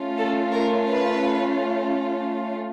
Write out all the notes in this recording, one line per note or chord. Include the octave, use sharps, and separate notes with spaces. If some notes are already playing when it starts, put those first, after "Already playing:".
Already playing: A3 C#4 F4
A4
A#4
B4